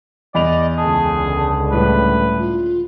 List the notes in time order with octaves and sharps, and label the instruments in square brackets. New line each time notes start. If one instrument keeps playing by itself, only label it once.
[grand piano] E2 B5 F7 [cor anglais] D5 [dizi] D#5
[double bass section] C#2 D3 [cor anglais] G#4 [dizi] A5
[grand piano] A2 G3 [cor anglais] B4
[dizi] F4